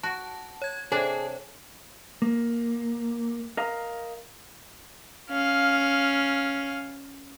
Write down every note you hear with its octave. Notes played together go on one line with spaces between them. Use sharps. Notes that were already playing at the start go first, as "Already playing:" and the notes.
F#4 A5
C#5 G#6
C3 D4 G#4 A4 C#5 A5
A#3
A#4 D#5 F5 A#5
C#4 F5